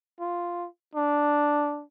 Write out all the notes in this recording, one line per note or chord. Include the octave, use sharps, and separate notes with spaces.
F4
D4